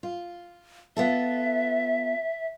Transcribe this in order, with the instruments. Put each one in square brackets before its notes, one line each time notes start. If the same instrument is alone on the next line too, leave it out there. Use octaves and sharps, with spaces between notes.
[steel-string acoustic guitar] F4
[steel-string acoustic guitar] B3 F4 A4 [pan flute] E5